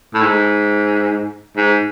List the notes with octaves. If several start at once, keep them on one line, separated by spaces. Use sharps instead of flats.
A2
G#2
G#2